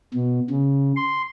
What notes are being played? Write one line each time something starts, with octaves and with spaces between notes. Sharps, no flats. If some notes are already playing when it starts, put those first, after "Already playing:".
B2
C#3
C6